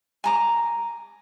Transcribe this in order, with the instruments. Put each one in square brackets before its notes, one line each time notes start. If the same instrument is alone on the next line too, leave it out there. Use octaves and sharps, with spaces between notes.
[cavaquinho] G#5 A#5 D6